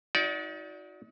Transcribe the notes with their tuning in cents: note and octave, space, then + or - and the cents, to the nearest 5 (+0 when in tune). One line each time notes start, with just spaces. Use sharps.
D#4 +30 F#4 -20 D5 -20